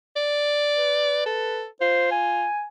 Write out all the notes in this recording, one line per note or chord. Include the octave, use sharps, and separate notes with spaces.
D5
B4
A4
F4 C5
G#5